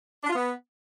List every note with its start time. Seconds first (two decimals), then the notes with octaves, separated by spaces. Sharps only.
0.24 D4
0.30 F4
0.36 B3